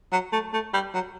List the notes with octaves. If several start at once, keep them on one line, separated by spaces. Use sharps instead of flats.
F#3
A3
A3
G3
F#3